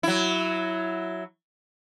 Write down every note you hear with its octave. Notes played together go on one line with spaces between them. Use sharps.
F#3 E4